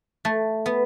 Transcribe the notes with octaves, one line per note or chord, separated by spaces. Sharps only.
A3
B3